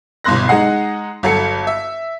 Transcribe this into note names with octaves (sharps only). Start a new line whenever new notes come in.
G1 C2 B2 C6 F#6 A#6
G#3 D#4 F#5 C7
G1 F#3 A4 C#7
E5